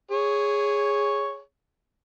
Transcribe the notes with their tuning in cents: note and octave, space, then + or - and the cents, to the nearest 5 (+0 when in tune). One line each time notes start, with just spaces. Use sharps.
G#4 -10 C#5 +0